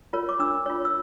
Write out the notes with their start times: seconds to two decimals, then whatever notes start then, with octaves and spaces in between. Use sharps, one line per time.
0.13 F4 A#4 C#5
0.29 D6
0.39 D4 E6
0.66 F4 C#5
0.85 E6